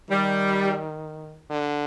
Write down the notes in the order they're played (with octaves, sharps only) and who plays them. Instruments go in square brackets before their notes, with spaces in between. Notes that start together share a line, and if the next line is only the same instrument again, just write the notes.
[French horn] D#3 [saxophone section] G3
[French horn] D3